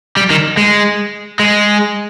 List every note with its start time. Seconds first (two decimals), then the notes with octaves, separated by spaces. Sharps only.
0.17 G3
0.30 D#3
0.57 G#3
1.40 G#3